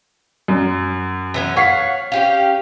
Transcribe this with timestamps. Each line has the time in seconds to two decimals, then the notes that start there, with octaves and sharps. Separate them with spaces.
0.48 F#2
1.34 E3 B3 C#4
1.56 C#5 F5 F#5 C#6 B6 C7
2.12 C#4 G4 F5